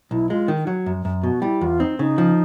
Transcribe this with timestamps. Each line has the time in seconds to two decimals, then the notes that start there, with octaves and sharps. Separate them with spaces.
0.11 B1 E4
0.30 G#3 F4
0.48 D#3
0.67 F#3
0.86 F#2
1.05 F#2
1.23 B2 F#4
1.42 G3 E4
1.61 E2 F4
1.80 C4 D#4
1.99 C#3 D#4
2.18 F3